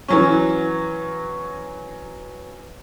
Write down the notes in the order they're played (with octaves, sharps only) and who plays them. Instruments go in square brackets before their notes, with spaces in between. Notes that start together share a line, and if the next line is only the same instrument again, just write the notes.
[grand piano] E3 F#3 C#4